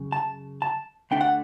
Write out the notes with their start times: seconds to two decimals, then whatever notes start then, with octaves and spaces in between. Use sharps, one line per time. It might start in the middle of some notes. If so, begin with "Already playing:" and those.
Already playing: F#2 C#3
0.12 A5
0.62 A5
1.11 D2 D3 A3 D4 G5
1.21 F#5